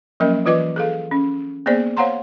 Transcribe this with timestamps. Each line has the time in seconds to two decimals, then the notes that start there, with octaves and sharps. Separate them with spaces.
0.20 F3 F#3 A#3 C#4 A#4 D#5
0.46 E3 F4 B4 D#5 D6
0.76 G#4 A4 F5
1.11 C#4
1.66 A#3 B3 G#4 C5 D5
1.97 C5 C#5 F5 F#5 A#5 C6